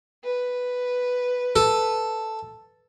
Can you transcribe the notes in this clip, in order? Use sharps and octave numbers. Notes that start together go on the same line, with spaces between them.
B4
A4